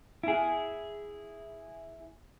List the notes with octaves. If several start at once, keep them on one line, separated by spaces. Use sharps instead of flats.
E4 G#4